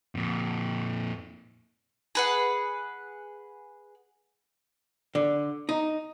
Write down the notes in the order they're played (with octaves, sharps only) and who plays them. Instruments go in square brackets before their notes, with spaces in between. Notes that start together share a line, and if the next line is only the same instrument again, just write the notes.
[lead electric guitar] F2 A#2
[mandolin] G#4 B4 F#5
[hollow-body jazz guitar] D3
D#4